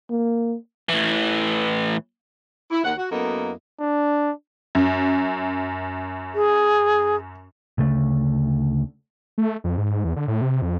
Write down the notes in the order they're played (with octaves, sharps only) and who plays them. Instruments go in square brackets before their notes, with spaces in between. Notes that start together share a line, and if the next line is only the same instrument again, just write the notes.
[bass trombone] A#3
[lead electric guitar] A2 E3
[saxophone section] E4
D#2 F#5
F#4
F#2 A#3 B3 E4 A4 D#5
[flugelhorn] D4
[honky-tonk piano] F#2
[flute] G#4
[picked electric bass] D2 C#3 A3
[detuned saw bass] A3
F2
G#2
E2
D3
A2
C3
F2